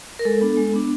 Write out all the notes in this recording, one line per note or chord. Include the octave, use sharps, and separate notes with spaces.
A#4
G#3 A4
B3 D4
G#3
B3 D4